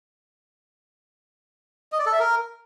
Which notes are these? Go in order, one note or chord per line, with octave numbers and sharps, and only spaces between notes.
D#5
D5
A4
E5
A#4